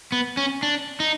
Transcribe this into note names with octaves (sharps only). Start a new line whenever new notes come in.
B3
C#4
D4
D#4